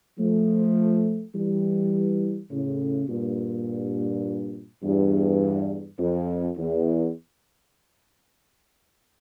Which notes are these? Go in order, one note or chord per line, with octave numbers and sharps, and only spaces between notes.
F3 A3
E3 G3
A2 C#3
G2 A#2
E2 G2
F2
E2